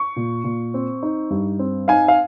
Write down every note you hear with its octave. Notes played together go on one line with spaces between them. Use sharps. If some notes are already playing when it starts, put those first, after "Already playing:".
Already playing: C#6
A#2
A#2
C4
D#4
G2
C4
D#4 F5 G#5
F5